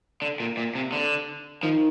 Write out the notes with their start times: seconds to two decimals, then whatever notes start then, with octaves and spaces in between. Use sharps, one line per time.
0.22 D3
0.40 A#2
0.57 A#2
0.75 C3
0.92 D3
1.63 D#3 F3